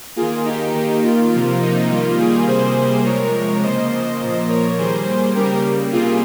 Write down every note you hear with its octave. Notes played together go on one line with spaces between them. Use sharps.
D#3 A#3 F4 G#4
D#4 G4
D#3 A#3
F4
C3 F3 A#3
D#4
D#3 G3 A#3 F4
F4 G#4
C3 G3 A#3 G#4 C5
C3 F3 G#3 A#4 C#5
C#3 F3 A#3 C5 D#5
A#2 F3 A#3
A#4 C#5
D#3 G3 A#3 G#4 C5
C#3 G3 A#3 G4 A#4
C3 G3 A#3 F4 G#4